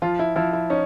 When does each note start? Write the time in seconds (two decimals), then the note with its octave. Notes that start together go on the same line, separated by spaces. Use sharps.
0.02 F3 F4
0.19 E4
0.36 F3 E4
0.53 E4
0.70 C#4 D#4